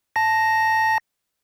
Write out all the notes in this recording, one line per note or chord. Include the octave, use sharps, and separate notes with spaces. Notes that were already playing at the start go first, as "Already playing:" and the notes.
A5 A#6